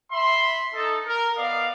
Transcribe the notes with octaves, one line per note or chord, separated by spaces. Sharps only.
E5 B5 C6
D#4 A4
A#4
B3 D5 D#5 F5